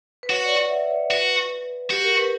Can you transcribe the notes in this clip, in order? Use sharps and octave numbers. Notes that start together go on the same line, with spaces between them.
B4
F#4 C#5
D5
F#5
E5
C#5
F#4 B4
F#4 G4
A#4
B4